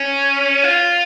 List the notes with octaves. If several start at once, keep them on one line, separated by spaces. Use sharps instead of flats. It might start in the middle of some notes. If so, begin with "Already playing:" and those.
Already playing: C#4
F4